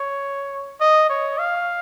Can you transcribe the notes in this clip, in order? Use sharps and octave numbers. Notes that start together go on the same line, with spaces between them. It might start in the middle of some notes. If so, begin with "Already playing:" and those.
Already playing: C#5
D#5
C#5
F5